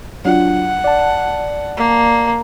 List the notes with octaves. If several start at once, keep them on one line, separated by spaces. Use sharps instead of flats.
F#3 D4 F4 F#5
D5 A5
A#3